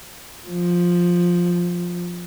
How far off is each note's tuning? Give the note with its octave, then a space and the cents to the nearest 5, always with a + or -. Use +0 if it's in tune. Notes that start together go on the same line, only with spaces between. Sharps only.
F3 +5